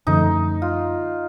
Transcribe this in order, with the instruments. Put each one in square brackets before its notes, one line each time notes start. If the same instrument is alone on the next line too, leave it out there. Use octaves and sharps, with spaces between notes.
[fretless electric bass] F#2 D3 F3 A3 [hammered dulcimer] D#4
[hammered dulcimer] F4